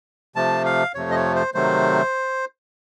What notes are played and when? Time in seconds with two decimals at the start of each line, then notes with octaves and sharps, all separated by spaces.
0.36 C3 F3 A3 A5
0.65 F5
0.95 F2 C3 F3 A3 C#5
1.11 D#5
1.15 C#5
1.35 C5
1.54 C3 D#3 F#3 A3 C5